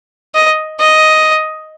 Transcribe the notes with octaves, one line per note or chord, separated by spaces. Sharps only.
D#5
D#5